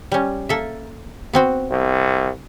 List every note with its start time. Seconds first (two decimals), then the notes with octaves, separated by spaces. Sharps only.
0.12 G3 C#4
0.49 A#3 A4 E5
1.33 B3 C4 F#4
1.70 C2